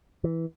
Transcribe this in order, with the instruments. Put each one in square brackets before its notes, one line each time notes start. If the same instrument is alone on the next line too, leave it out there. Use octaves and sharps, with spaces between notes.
[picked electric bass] E3